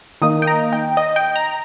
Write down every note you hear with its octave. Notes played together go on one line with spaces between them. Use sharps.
D#3 A#3 D#4 D#6
G5
A#5
G5
D#5
G5
A#5